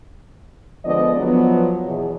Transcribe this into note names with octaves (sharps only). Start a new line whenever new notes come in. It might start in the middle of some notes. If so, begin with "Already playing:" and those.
D3 F3 G#3 B3 D5 D#5
F3 F#3 B3
E2 B2 E3